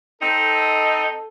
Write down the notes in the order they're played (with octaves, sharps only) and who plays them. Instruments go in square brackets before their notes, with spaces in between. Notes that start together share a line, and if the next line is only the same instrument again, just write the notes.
[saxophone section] C4 D#4 [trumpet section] A4